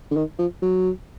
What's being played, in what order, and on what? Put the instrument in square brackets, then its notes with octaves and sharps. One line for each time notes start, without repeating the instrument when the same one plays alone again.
[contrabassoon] D3
D#3
F3
F#3